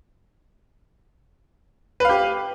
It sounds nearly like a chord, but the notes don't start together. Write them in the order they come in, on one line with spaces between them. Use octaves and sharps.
B4 F5 G4